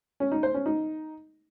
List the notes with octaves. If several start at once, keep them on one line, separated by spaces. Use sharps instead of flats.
C#4
D#4
C5
C#4
D#4